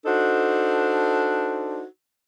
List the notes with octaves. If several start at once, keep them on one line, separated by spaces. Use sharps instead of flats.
D4 D#4 F#4 A4 C5